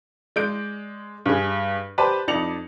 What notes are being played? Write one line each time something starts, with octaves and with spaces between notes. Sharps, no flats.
G#3 D5 G6 D7
G2 G#4
G4 B4 C5 D5 A5
F2 D#4 D5 C#7 F7 F#7